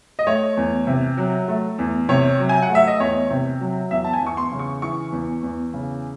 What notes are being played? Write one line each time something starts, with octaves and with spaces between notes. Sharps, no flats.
D#5
A3 C#5
E2
C3
F#3
A3
E2
C3 C#5
F#3
G#5
F#5
A3
E5
D#5
E2 C#5
C3
F#3
E2 E5
A5
G#5
E2
C#6
C6
C#3
C#6
E3 C#6
E2
E2
C#3